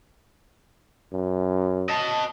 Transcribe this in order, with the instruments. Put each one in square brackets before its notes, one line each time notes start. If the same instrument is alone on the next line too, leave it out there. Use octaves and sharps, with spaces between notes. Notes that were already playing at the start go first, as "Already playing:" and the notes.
[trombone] F#2
[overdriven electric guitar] D#5 A5